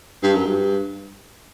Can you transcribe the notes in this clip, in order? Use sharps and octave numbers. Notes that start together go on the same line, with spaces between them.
G2
F#2
G2